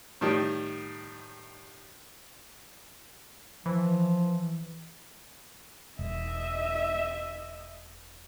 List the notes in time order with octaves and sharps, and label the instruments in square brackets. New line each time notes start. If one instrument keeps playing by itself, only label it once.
[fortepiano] A2 D#3 G3
[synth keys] E3 [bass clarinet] F3
[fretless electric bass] E1 [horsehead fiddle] D#5 E5